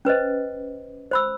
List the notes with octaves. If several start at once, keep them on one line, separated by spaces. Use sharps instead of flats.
C#4 B4 C5 D#5
C5 B5 E6